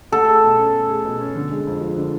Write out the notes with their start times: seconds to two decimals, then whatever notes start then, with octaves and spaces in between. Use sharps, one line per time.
0.12 A3 A4
0.27 G#4
0.43 B2
0.58 C#4
0.74 A3
0.89 G#4
1.04 B2
1.20 C#4
1.36 D3
1.51 G#3
1.67 F2
1.81 F3
1.97 D3